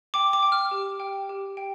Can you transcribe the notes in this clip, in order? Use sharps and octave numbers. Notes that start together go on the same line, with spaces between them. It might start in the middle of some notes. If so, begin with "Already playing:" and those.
G5 D6
D6
G5
F6
G4
G5
G4
G5